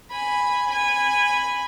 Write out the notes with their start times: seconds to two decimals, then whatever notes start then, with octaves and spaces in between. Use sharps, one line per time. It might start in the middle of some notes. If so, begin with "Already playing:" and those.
0.11 G#5 B5
0.70 G#5 B5